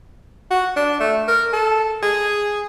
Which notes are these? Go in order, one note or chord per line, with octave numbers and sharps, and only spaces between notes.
F#4
D4
A3
A#4
A4
G#4